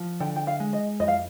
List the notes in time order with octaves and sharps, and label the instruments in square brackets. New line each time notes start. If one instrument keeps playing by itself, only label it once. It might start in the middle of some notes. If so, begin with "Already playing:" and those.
Already playing: [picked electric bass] F3
[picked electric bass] D3 [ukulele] G5
[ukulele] G5
F5
[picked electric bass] G#3
[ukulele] D#5
[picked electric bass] F2 [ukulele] D#5
[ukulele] F5